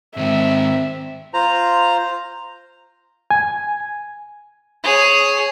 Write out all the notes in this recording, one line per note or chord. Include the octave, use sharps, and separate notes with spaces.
G#2 D#3 C4 E5
F4 C5 A#5
G#5
G#4 C#5